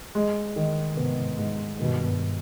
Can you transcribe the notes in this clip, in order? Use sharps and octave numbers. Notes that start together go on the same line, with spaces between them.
G#3
D#3
G#2 C3 B3
G#2
G2 B2 D#3